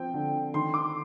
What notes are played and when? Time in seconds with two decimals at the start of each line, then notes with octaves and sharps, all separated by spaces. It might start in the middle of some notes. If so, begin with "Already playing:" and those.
Already playing: F3 C4 G5
0.14 D3
0.54 D#3 C6
0.74 D6